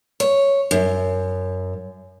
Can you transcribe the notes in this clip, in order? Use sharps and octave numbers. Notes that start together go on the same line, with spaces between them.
C#5
F#2